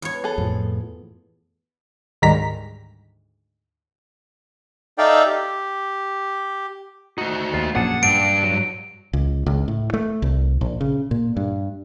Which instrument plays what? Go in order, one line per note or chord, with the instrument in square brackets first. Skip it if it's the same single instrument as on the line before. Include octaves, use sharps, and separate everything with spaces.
[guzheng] E2 C#5
[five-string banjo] B3 G#4 A4
[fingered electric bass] F2 A2 F3
[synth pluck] D2 G#2 D#3 G3 A#5 B6
[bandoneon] D#4 A4 D5 E5 F5 G5
G4
[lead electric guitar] A3 F#4 [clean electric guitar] D#4
[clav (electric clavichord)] D#2 [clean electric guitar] F4
[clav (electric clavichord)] A#1 F#2 A#2 [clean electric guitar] D4 G#4 A4 [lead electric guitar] F#5
[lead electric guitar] G2 [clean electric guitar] D4 [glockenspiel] D7
[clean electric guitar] F#3
[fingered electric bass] C#2
C#2
A2
A3
C2
A#1
C#3
A#2
G2